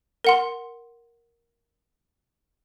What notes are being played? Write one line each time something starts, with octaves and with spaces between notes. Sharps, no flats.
A#4 F#5 C6